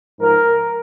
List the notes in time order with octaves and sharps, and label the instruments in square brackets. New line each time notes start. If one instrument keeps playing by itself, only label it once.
[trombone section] G#2 F3 A#4